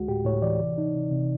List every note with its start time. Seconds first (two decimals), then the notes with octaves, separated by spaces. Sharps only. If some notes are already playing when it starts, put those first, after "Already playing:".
Already playing: D2 G#3 F#4
0.08 A2 G4
0.25 A2 C#5
0.42 E3 D5
0.60 C3
0.78 D#4
0.95 C3
1.11 C3